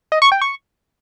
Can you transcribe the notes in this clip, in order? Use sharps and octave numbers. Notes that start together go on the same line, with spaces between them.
D#5
C#6
G5
C#6